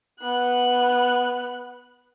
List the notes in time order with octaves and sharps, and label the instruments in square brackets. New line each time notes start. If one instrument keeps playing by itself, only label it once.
[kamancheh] B3 F#6